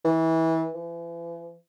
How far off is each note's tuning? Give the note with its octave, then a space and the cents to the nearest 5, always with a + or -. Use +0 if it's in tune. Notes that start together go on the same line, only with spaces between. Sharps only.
E3 -25
E3 +40